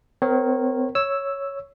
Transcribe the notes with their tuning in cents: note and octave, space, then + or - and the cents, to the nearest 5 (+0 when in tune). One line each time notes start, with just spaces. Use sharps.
C4 -40 A#4 +0 C#5 -25
C#5 +0 E6 +0